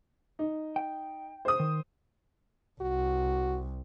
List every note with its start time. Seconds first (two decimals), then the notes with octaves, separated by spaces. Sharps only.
0.39 D#4
0.76 G5
1.45 C5 D#6
1.60 D#3
2.81 C2 F#4